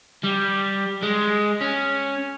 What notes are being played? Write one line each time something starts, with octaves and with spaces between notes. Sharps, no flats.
G3
G#3
C#4